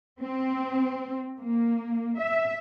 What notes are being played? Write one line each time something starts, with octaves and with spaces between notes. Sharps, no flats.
C4
A#3
E5